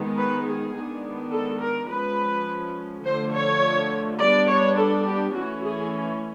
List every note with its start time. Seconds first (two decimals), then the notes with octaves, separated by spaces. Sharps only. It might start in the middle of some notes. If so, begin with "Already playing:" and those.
Already playing: D#3 G#3 B3
0.17 B4
0.46 G#4
0.75 D#3 G#3 B3 D4
1.32 A4
1.61 A#4
1.90 F3 G#3 C#4 B4
3.05 D3 F3 A3 C5
3.34 C#5
4.19 G3 B3 D4 D5
4.49 C#5
4.77 A4
5.06 G4
5.34 E3 A3 C#4 F#4
5.63 G#4